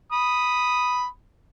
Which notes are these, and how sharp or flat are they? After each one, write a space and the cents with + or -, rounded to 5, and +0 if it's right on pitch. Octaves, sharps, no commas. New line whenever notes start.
B5 +0 D#6 +0